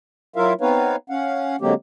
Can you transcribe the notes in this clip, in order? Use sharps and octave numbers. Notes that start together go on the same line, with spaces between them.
F#3 E4 F4 A#4 E5 F5
B3 C4 D#4 B4 C#5 F5
C#4 F5 F#5
D3 F#3 G#3 A#3 C4 G4